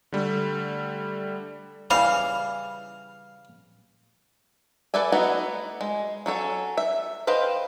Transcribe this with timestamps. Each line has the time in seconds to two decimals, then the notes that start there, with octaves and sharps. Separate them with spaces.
0.12 D3 G3 A3
1.90 C#3 E3 G3 F5
4.94 A4 B4 D5 E5 G#5
5.12 A3 B3 D#4 E4 F#4
5.81 G#3
6.26 F#3 C#4 A4 C#5
6.77 E5
7.27 B4 C5 D#5 F5 G5